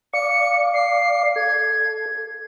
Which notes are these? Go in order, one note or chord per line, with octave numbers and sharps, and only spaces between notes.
D5 F5 D6 C#7
C7
A4 G#6